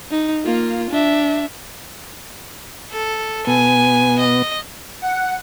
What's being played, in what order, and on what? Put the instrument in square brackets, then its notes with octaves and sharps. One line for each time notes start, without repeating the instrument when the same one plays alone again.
[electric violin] D#4
A#3 F4
D4 E5
[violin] A4
[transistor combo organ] B2 B3 [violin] G#5
[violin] D#5
[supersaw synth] F#5